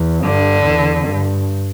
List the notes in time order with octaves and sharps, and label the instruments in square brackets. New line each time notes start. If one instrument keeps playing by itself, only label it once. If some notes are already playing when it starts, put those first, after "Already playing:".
Already playing: [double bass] E2
[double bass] G2 [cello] D3
[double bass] E2
G2